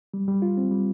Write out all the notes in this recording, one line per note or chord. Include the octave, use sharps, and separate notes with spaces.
G3
G3
F4
C4
G3